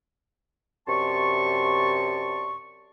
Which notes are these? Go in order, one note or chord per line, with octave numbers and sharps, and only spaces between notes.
F#2 C3 D5 A5 C6 C#6